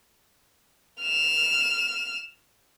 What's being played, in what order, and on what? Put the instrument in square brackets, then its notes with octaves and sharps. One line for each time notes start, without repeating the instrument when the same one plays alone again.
[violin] F6 E7